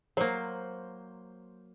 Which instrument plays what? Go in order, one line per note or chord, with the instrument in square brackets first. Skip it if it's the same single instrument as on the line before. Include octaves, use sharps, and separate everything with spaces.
[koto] F#3 A#3 [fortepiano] C5